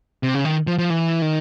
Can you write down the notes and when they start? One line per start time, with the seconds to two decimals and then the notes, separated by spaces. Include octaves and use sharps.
0.23 C3
0.35 C#3
0.45 D#3
0.67 F3
0.78 F3
0.90 E3
1.22 D#3